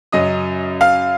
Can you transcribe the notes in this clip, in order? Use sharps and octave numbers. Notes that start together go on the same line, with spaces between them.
F#2 C#3 F#3 D#5 D#6
F5 F6